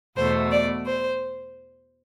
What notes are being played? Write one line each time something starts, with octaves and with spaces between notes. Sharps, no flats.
E2 B2 A3 C5
D5
C5